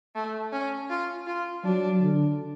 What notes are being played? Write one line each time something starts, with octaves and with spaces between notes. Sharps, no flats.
A3
C#4
F4
F4
F#3 D4
D3